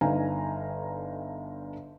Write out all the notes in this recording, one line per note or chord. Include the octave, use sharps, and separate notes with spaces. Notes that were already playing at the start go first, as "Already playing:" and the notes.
G1 D3 D#4 F5 G#5 A#5